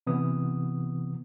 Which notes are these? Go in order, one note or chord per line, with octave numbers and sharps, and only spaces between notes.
C3 E3 B3 D#6